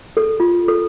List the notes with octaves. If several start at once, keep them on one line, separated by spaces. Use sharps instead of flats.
A4
F4
A4